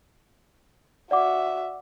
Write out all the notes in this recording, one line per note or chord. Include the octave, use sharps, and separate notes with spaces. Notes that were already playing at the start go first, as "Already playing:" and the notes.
F#4 D5 E5 F#5 D6